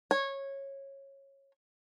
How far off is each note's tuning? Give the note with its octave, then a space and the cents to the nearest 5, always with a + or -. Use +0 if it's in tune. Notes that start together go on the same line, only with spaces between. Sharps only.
C#5 -15